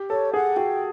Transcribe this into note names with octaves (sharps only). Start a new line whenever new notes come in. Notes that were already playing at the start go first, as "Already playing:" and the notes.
Already playing: G4
A4 C#5
G#4 F#5
F#4 G5